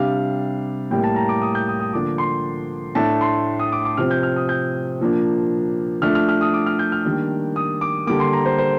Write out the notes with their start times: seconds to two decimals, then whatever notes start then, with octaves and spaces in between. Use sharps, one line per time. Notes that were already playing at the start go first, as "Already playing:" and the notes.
Already playing: C3 G3 D4 F5
0.91 A2 G3 A#3 G5
1.04 A5
1.16 A#5
1.29 D6
1.42 D#6
1.55 G6
1.68 D#6
1.80 D#6
1.93 D3 F3 A#3 D4 D6
2.18 C6
2.95 A2 A3 D4 A5
3.21 C6
3.59 D#6
3.72 D6
3.85 D6
3.97 C3 F3 C4 F6
4.11 G6
4.23 F6
4.36 D#6
4.49 G6
5.01 A#2 F3 A#3 D4
6.02 F3 A3 D4 F6
6.15 F6
6.29 F6
6.41 D#6
6.54 D6
6.66 F6
6.79 G6
6.92 F6
7.04 D#3 G3 A#3 D4
7.56 D#6
7.81 D6
8.07 D3 G3 A#3 D6
8.20 C6
8.33 A#5
8.45 C5
8.58 C5